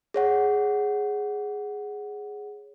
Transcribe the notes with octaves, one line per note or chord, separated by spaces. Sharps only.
G#4 C#5 F#5